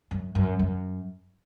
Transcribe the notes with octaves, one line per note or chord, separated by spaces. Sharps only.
F#2
F#2
F#2